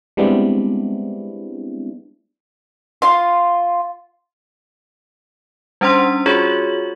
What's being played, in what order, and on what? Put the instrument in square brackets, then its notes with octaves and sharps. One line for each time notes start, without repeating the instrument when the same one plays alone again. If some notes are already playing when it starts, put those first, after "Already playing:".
[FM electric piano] G3 G#3 B3 C4 D4 E4
[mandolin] F4 C6
[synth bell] G3 C#4 D4 C5 F#5 C6
F4 F#4 G#4 C#5 F#7